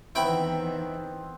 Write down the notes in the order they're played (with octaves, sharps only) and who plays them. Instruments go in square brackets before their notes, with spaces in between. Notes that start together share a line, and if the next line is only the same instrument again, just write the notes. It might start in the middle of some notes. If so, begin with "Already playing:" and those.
[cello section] E2 D#3 E3 [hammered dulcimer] B3 C4 [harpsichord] E4 G5 B5